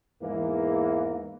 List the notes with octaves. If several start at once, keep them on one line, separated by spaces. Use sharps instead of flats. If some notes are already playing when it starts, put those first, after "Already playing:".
E2 G#2 E3 A#3